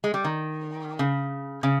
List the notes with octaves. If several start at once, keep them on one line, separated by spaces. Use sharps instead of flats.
G#3
G3
D#3
C#3
C#3